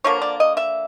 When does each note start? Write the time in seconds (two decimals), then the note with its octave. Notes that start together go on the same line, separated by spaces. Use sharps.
0.04 D3 F3 A#3 C#5
0.22 D5
0.40 D#5
0.57 E5